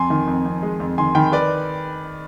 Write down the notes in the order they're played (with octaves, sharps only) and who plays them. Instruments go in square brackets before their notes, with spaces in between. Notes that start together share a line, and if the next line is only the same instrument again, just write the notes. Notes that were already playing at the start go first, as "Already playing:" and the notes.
Already playing: [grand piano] F2 G#5 C6
D#3
F2
F2
G#3
F2
D#3 G#5 C6
D#3 G5 B5
B4 D5